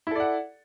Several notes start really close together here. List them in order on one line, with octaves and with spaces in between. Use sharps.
E4 A4 D5 F#5